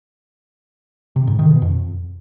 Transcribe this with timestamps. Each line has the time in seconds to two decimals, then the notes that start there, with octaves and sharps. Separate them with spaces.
1.16 C3
1.27 G#2
1.39 D#3
1.50 B2
1.62 F2